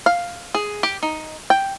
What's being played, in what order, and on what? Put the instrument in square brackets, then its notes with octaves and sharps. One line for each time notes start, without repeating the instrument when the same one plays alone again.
[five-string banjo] F5
G#4
G4
D#4
G5